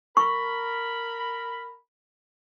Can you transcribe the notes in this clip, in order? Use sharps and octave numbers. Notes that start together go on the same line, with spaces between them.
A#4 B5 C#6